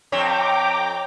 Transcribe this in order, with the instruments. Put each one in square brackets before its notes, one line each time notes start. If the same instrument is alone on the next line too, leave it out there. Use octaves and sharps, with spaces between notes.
[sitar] F2 C4 C#5 [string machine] G5 A#5 D6